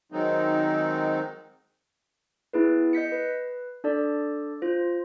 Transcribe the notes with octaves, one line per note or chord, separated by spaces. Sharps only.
D#3 F#3 G#3 C4 D#4
B3 E4 G#4 B4
D#5 G6 B6 C#7
B4
D4 A4 D5
F4 C5